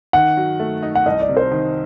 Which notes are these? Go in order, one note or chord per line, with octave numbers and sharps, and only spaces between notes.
D#3 F#5
F#3
A3
D#4
F#5
C2 D#5
D5
C3
C5
D#3